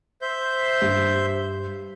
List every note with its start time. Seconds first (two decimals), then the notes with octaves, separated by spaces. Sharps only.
0.22 C5 E5 G6
0.82 G2